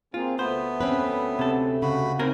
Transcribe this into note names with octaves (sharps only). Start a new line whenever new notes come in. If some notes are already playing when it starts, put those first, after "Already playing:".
A#3 C4 F4 G#4
D2 A3 B3 C5
C4 C#4 B4
C3 A4
C#3 F#4 B5
C4 C#4 D#4 A#4